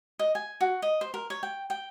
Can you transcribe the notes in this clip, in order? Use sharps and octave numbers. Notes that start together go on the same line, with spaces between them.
D#5
G#5
F#4
D#5
C5
A#4
C#5
G5
G5